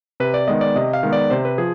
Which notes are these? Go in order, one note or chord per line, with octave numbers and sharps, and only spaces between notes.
C3 B4
D5
D#3 G#3 B3 D#5
D5
C3 D#5
F5
D#3 G#3 B3
D5
C3 C5
B4
F3 G#4